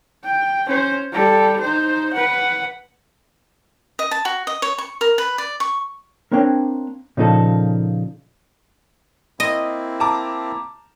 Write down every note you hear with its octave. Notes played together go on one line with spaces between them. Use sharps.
G5
C#4 C5
G3 A4
D#4 C5
B4 F#5
D#5
A5
F#4
D#5
C#5
C#6
A#4
B4
D5
C#6
A#3 C4 D4 C#5 G5
A#2 C#3 F3 D#4 A4
A#3 C4 E4 D#5
A5 A#5 D6